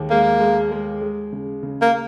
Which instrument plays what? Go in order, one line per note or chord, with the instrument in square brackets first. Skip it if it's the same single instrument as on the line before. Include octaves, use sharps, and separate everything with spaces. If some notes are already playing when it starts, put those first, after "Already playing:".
Already playing: [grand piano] D#2 G#3
[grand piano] G#3 [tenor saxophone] A#3
[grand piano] G#3
G#3
G#3
C#3
C#3
[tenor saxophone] A#3